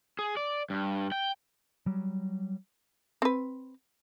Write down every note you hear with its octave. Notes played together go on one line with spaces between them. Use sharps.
G#4
D5
G2
G5
F#3 G3
C4 B4